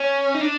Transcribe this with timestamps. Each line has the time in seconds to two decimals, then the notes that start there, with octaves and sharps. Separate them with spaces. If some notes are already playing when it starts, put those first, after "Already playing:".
Already playing: C#4
0.34 D#4
0.41 D4